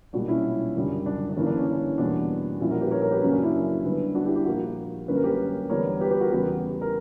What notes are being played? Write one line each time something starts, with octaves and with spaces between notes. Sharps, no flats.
B1 A#2 G3 D4 F#4
C#4 E4
F#1 F#2 D3 G3
D4
D4
G1 G2 E3 A#3 C#4
D4
C#4
D4
E2 B2 G3 A#3 D4
A#1 A#2 G3 C#4 E4
F#4 A#4
G4 B4
A#4 C#5
A#4 C#5
G4 B4
F#2 C#3 F#3 A#3 C#4
D4
C#4 E4
G2 D3 G3 B3
D4 F#4
E4 G4
E4 G4
A#1 A#2 A#3 F#4 A#4
F#2 D3 G3 A#3 C#4 B4
A#4
G4 B4
E2 D3 G3 B3 A#4 C#5
G4 B4
G4 B4
F#4 A#4
E2 C#3 G3 B3 F#4 A#4
G4
A#4